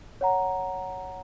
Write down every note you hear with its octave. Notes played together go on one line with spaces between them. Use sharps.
C#5 F#5 A#5